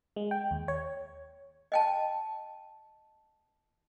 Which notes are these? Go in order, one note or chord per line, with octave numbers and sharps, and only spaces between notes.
G#3
G5
D#2
C#5
D#5 G5 A5